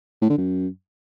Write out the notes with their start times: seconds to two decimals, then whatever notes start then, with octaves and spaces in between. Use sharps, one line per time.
0.22 A2
0.30 D3
0.38 F#2